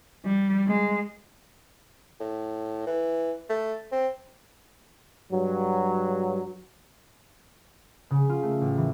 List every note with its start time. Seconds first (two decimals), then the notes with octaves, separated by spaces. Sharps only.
0.25 G3
0.67 G#3
2.20 A2
2.87 E3
3.49 A3
3.92 C4
5.33 G2 F#3
8.11 C#3
8.29 F4
8.43 A3
8.61 A1
8.78 E3